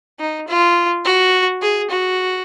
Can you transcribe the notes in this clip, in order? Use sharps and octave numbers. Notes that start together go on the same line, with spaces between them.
D#4
F4
F#4
G#4
F#4